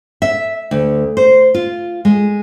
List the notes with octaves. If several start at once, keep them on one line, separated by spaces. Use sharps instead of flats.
E5
D2
C5
F4
G#3